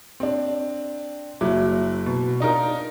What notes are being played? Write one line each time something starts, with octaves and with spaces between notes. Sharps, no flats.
C4 D4
F#1 F#3 E4 D6
B2
D4 D#4 F4 A#4